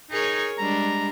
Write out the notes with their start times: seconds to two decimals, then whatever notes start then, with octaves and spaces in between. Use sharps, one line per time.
0.11 D#4 G#4 A#4 C#5
0.58 G3 G#3 D4 A#5